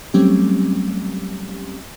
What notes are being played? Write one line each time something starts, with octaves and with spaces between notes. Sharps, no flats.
F#3 G3 A3 C4 C#4 G4